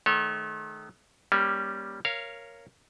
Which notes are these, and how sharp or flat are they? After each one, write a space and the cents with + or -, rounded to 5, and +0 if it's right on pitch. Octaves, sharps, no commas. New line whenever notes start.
D#3 -20 A3 -40 C#5 -30
G3 +0 A#3 +25 C#4 +0
A#4 +0 C#5 +0 F5 -15